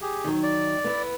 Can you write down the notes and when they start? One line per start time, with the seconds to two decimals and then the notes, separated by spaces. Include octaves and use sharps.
0.01 G4 G#4
0.24 D#3 F#3
0.43 D5
0.84 B3 E4